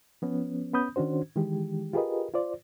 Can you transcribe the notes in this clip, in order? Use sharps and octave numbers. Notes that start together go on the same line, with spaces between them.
F3 B3 C#4
B3 C#4 B5 D#6 G6
D#3 C#4 D4 F#4 C5
D#3 E3 G#3 G4
F4 G4 G#4 A#4 B4 D#5
F4 C5 D5